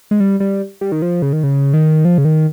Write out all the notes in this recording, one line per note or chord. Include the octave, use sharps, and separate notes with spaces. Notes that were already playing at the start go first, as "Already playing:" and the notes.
G#3
G3
G3
G3
D#3
F3
C#3
D#3
C#3
D#3
F3
C#3
D#3